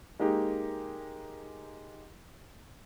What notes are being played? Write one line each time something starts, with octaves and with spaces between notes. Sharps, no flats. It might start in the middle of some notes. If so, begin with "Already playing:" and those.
G#3 A#3 D#4 G4